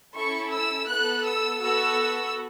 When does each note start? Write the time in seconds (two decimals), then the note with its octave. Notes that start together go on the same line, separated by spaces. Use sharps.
0.15 C#4 E4 A4 C#6
0.52 E6
0.89 B3 A4 F#6
1.26 E6
1.62 B3 F#4 A4 E6